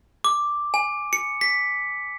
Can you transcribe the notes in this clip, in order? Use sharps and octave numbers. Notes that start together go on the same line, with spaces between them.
D6
G#5
C#7
B6